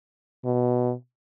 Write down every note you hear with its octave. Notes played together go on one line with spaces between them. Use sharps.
B2